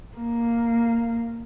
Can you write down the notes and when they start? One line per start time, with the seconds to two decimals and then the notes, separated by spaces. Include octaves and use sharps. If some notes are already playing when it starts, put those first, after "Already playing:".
0.17 A#3